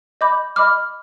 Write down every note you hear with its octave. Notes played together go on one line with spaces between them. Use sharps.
D#5 B5 D6 G6
D#5 B5 D6 F6